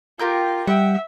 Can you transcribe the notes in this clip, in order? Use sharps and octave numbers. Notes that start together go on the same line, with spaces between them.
F4 G4 A#4 G6
G3 E5 F#5 G5